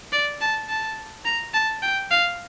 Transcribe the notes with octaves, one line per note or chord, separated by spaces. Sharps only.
D5
A5
A5
A#5
A5
G5
F5